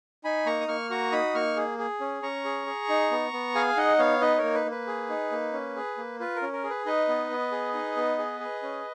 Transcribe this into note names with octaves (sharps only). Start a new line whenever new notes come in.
D#4 G#5 B5
A#3 A#5 C#6
D#6
A#3 C#6 F6
F#4 A#5 C#6
D#4 B5 D#6
A#3 C#6 F6
G#4
G#4
C#4
C#4 A#5 C#6
G#4
G#4
D#4
B3
B3
G#4 F5 G#5
D#4 D#5 F#5
B3 C#5 F5
D#4 B4 D#5
A#4 C#5
A#3
B4
A#3
B4
G#4
D#4
A#3
C#4
G#4
A#3
F4 B4
A#4
C#4
A#4
G#4
B4
D#4 B4 D#5
B3
B3
G#4
D#4
B3
G#4
G#4
C#4